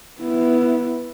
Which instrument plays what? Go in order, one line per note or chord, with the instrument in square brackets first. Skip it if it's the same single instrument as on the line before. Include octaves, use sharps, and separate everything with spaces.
[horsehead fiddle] B3 E4